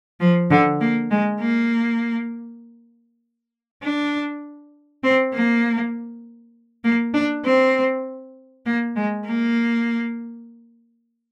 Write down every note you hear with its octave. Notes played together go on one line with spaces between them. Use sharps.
F3
D3
A#3
G#3
A#3
D4
C4
A#3
A#3
D4
C4
A#3
G#3
A#3